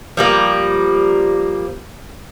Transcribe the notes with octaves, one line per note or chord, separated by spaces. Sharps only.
F3 G3 A#3